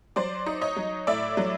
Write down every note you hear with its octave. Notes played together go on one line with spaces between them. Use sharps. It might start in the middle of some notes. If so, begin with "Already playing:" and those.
F#3 C5 D5
D#4
C#5 D#5
F#3
A2 D5 E5
F#3